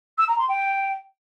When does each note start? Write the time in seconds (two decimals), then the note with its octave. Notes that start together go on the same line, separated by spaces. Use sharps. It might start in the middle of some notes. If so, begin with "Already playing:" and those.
0.18 E6
0.28 A#5
0.38 C6
0.48 G5